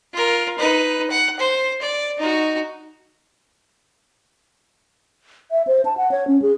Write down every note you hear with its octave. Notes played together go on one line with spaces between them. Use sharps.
F4 A#4
D#4 B4
F#5
C5
D5
D#4 F#4
E5
C5
A5
F#5
C#5
C#4
G#4